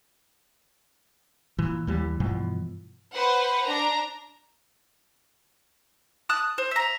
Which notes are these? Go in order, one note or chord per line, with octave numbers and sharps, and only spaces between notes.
A#2 E3
D#2 E3 G3
G2 B2 E3 F3
B4 C5 F#5
D4 A#5
A5 D#6 F#6
C5
E5 A#5